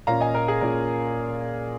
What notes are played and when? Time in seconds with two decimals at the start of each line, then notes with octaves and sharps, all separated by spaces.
0.07 A#2 A#3 C#4 F4 F5 A#5
0.20 D#5 G#5
0.35 A#4
0.48 G#4
0.61 A#2 A#3 C#4 F4 A#4